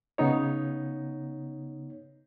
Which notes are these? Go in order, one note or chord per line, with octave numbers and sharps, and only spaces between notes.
C#3 B3 D#4 C#5